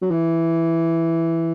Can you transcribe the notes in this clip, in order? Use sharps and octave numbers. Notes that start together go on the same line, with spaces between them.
F#3
E3